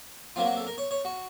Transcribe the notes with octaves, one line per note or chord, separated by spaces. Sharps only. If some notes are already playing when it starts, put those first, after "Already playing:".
C3 F#3 A#3 F4
F#4
A4
A#4
C#5
C#5
F#4